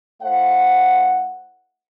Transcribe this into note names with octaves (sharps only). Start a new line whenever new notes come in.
A3 E4 C5 F5 F#5